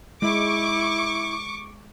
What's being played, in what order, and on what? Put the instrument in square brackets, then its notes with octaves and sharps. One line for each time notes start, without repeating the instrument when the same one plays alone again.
[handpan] G#3 [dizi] E4 [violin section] C#6 D6